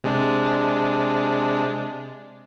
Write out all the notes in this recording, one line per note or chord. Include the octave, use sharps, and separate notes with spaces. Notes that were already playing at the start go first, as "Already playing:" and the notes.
C3 G#3 D4